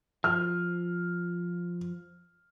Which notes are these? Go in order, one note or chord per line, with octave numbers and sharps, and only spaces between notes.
F3 F6